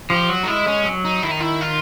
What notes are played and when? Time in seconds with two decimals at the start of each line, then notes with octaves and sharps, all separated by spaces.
0.10 F3 G4
0.29 F#3 F#4
0.43 D#4
0.48 G#3 E4
0.67 C#4
0.86 F#3
1.05 D#4
1.23 D#3 E4
1.31 D#4
1.40 E4
1.61 F4